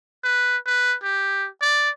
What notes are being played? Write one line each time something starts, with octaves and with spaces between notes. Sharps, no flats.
B4
B4
G4
D5